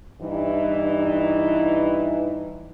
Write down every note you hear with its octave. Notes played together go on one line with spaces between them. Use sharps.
G2 E3 D#4